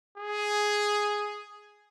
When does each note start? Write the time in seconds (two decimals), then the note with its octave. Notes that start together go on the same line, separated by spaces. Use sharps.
0.18 G#4